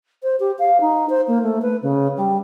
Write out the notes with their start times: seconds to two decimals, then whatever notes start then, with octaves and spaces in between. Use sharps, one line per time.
0.23 C5
0.40 G4
0.59 F5
0.81 D#4
1.09 C5
1.28 A#3
1.42 A3
1.62 B4
1.83 C#3
2.17 G3